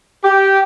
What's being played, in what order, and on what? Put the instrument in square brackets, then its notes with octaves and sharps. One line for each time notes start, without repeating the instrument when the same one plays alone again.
[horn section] G4